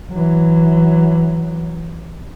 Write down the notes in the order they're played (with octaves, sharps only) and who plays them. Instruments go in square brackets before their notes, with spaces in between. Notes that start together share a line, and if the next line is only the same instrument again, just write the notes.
[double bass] E3 F#3